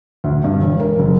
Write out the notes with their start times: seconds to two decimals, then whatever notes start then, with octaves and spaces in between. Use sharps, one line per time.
0.24 D2
0.44 G2
0.60 E1
0.80 A#4
0.99 F#1